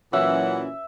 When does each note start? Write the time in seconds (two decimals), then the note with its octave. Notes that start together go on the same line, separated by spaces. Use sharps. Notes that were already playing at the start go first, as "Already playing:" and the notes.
0.13 A#2 E3 F#3 C#4 E5 F#5